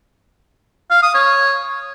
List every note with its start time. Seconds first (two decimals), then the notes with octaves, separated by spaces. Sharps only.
0.90 F5
1.02 D#6
1.14 C#5